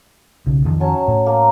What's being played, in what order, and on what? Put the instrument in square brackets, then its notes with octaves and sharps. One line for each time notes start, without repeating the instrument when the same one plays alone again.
[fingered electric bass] B1 C#3
F2 D#3 F3
[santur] F#3 C#4 A5
[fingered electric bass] A2
[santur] A#3